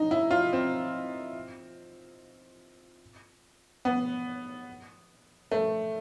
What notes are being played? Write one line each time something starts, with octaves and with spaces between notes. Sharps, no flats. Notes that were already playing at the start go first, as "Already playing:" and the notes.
Already playing: D#4
E4
F4
C4
B3
A3